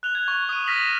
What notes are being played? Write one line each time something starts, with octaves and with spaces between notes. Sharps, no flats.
F#6 F7 G7
G#6
C#6 F#6
D#6 D#7
F6 A#6 B6 D#7 F7 F#7
E7